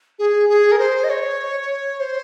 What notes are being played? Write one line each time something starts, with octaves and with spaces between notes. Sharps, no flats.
G#4
G#4
A#4
C5
D#5
C#5
C5